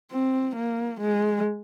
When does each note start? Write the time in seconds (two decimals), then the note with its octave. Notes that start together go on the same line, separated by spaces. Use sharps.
0.11 C4
0.56 A#3
1.01 G#3